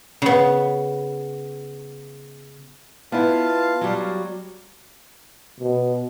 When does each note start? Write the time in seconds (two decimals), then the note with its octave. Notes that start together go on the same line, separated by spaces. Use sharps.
0.22 C#3 B3
3.12 B3 E4 F4 F5 A5
3.81 F#3 G3
5.60 B2